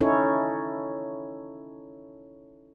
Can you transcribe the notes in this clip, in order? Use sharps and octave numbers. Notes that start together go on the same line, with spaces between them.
C#4 D#4 E4 A4 C#5